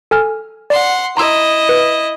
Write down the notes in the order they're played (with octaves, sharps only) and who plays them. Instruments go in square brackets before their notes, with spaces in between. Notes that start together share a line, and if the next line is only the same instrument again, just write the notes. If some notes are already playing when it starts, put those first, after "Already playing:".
[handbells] A4 G#5 F6
[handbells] D5 [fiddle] F#5 C6
[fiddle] E4 D#5 [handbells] A#5 C6 E6
[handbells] B4